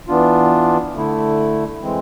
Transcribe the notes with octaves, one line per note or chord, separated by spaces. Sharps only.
E3 B3 D4 F4
D3 A3 E4
E3 G#3 C4